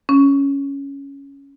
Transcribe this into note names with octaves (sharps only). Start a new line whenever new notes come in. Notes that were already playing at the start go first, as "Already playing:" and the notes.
C#4